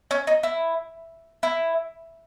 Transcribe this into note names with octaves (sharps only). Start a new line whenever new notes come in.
C#4
D#4
E4
E4